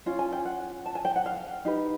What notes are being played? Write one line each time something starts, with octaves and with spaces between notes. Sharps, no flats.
C#4 F4
G#5
G5
F#5
A5
G#5
G5
F#5
F5
D#4 G4 B4